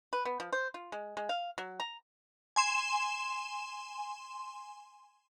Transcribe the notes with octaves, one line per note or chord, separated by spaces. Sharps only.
B4
B3
F3
C5
F4
G#3
G#3
F5
F#3
A#5
G#5 C6 E7